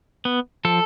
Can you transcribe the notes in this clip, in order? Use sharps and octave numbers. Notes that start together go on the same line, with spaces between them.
B3
F3 A4